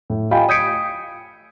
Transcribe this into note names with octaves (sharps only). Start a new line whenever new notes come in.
A2
F4 G4 D#5 G5 G#5 B5
D#6 G6 G#6 B6 C#7 D7